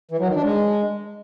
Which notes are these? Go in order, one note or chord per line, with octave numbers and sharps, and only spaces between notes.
E3
F#3
D#3
D4
G#3